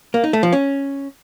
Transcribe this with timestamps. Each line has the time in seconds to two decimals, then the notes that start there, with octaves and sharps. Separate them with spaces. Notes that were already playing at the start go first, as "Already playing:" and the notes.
0.14 A#3
0.24 D#4
0.33 A3
0.43 F3
0.53 C#4